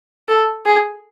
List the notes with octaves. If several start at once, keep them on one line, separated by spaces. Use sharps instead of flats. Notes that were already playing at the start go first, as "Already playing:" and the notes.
A4
G#4